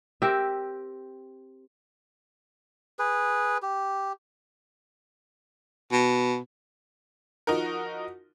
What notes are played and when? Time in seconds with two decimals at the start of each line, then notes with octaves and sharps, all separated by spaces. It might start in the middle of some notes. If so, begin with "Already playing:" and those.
0.22 C4 G4 A#4 E5
2.99 G#4 B4
3.62 G4
5.92 B2
7.47 F3 D#4 F#4 A#4